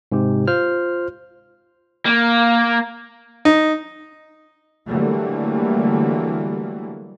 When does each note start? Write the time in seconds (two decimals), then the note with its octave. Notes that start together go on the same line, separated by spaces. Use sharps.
0.12 G#2 C3 G4
0.48 F4 C5 F6
2.06 A#3
3.45 D#4
4.87 D3 E3 F#3 G3 A3 A#3